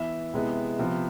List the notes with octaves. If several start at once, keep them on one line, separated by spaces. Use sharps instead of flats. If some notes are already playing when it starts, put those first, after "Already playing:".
Already playing: E3 B3 E4 E5
C3 G#3 B3 E4
C3 F3 B3